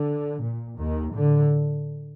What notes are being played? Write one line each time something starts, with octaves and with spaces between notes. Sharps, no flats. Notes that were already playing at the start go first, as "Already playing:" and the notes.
Already playing: D3
A#2
D#2 D#3
A2 D3